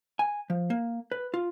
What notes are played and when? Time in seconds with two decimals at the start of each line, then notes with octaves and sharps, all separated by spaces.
0.19 G#5
0.50 F3
0.70 A#3
1.12 B4
1.34 F4